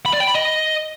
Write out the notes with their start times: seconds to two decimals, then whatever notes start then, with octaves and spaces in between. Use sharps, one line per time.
0.06 B5
0.13 D5
0.20 G5
0.28 B5
0.35 D#5